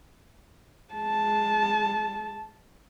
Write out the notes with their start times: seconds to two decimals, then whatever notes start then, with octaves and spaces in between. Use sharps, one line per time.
0.93 G#3 A5